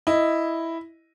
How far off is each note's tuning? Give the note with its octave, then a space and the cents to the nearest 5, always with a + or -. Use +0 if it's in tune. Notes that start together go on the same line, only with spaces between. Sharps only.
E4 +0 D#5 +0